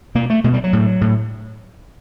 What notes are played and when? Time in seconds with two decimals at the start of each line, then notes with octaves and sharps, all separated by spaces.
0.15 B2 A#3
0.30 A3
0.44 B2 G#3
0.54 G3
0.64 F#3
0.73 A2
1.01 A2